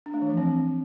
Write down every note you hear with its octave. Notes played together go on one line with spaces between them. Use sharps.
D4
A3
E3
F3
C4